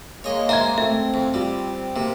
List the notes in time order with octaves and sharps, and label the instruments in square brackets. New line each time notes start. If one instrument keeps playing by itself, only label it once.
[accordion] G#3 A#3 [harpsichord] C#5 D#5
[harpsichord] C5 G#5 [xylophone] E5 [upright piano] A#5 G#6
[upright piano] A3 [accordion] C4 [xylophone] E5
[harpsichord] F2
[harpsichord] G3 [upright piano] F4
[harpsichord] C3 [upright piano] A#3